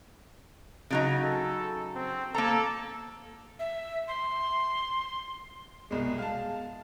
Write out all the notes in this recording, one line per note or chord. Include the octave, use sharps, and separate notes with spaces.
C#3 F#3 D#4
A4
C4
A#3 A4 A#5
E5
C6
C2 B2 G#3
F5 A5